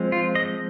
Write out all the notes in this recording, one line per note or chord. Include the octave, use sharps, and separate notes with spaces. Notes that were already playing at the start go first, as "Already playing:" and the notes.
Already playing: F3 G#3 C4
F4
D#5